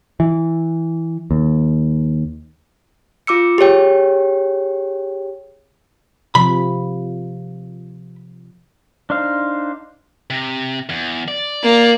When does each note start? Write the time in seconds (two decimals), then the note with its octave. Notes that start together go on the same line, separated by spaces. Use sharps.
0.20 E3
1.31 D#2
3.27 F4 D6 E6 C#7
3.58 G4 G#4 C#5 G5
6.35 C3 F3 B5
9.10 D4 D#4 C5 F5
10.30 C3
10.89 E2
11.28 D5
11.63 A#3